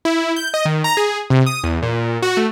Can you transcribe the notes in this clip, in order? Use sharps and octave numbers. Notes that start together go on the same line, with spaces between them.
E4
G6
D#5
D#3
A#5
G#4
C3
D#6
E2
A#2
F#4
A3